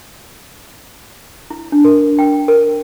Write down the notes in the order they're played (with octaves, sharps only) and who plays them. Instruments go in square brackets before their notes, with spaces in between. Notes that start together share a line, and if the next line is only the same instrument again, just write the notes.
[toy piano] E4
D4
A#4
G5
A#4